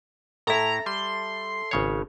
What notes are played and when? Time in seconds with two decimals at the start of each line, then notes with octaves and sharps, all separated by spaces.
0.47 A2 E4 A4 E5 A#5
0.86 G3 C6
1.71 G#1 C#3 C#5